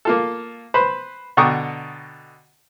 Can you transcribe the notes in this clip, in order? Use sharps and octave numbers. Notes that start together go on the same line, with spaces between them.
A#3 F4 A4
B4 C5 B5
B2 D3 G5 A#5 C#6 D#6